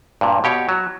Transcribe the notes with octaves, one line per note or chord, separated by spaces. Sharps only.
G2 A#2
B2 G4 C#5
F#3